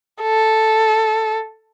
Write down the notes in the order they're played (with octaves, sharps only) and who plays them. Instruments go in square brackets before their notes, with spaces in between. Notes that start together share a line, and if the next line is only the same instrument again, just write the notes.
[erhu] A4